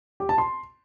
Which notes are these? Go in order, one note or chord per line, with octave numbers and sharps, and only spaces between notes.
G4
A5
C6